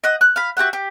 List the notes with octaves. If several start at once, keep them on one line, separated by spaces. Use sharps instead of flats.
D#5 F#5 G6
F#6
F5 B5
F#4 G4 E5 F#5
G4